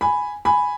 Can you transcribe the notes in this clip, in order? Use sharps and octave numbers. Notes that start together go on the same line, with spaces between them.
G#5 B5
G#5 B5